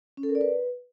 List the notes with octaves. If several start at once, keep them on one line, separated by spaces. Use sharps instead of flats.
C#4
A4
A#4
D5
B4